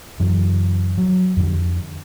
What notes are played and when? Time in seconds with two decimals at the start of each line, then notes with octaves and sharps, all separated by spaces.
0.20 F#2 C#3 E3 F#3
0.98 F#3
1.36 F2 D3